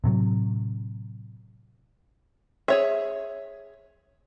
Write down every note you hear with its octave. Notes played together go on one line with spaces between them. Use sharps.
A2 C3 F#3
G#4 C#5 E5